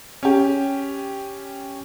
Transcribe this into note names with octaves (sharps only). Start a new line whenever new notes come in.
C#4 G4